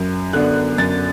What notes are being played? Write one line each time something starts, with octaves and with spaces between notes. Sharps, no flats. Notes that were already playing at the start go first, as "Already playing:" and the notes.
Already playing: F#2
D3 B3 D4 F#6
F#2 A6